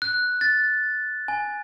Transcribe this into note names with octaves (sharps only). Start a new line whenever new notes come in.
F#6
A6
G#5